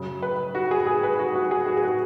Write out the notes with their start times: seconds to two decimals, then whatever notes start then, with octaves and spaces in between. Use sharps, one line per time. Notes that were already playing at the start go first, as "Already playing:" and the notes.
Already playing: F#2 C#3 F#3
0.22 B4
0.55 F#4
0.71 G#4
0.87 G#4
1.03 B4
1.19 F#4
1.35 F#4
1.51 G#4
1.67 F#4
1.77 G#4
1.83 F#4